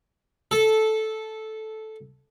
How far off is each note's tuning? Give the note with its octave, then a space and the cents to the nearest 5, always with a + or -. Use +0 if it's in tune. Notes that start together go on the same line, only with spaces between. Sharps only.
A4 -10